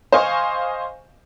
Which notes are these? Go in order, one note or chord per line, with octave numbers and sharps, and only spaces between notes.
C5 D#5 F5 G#5 C#6